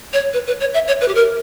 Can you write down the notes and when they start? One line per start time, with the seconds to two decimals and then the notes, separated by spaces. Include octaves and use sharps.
0.13 C#5
0.33 B4
0.47 B4
0.60 C#5
0.74 E5
0.87 C#5
1.01 B4
1.08 G4
1.15 A#4